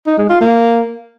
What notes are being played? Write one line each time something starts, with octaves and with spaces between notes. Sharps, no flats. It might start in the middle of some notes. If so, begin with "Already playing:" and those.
D#4
G#3
F4
A#3